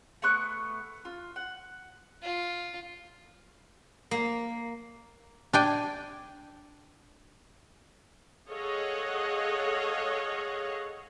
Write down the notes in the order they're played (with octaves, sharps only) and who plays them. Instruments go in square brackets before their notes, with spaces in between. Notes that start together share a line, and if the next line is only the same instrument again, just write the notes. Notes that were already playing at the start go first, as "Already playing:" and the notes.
[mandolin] A3 B3 C#6 F#6
F4
F#5
[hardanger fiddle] F4
[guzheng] A#3
[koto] D4 G5 G#5
[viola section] G#4 A4 C#5 D#5 F5 F#5